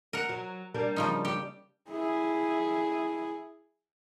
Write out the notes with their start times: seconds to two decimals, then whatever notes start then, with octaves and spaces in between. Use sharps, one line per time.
0.13 A#4 F#5
0.29 F#3
0.74 G3 A#3 D4
0.96 C#3 F3 D#4
1.25 G4
1.89 E4 G#4